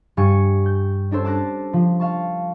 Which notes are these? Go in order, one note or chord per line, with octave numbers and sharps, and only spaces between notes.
G2 G3 G#5 C#6 C#7
G6
C#4 D4 A4 C5
A5 D6 F#6 A#6
F3
F5 A5 C#6